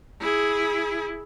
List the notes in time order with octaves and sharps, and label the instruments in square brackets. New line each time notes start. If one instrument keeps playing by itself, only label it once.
[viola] E4 G#4